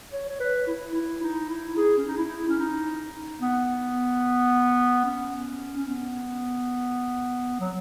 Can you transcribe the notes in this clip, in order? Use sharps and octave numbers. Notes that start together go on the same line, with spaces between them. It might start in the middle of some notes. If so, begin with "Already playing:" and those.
C#5
C#5
B4
E4
E4
D#4
E4
G#4
C#4
D#4
E4
C#4
D#4
B3
C#4
C#4
B3
F#3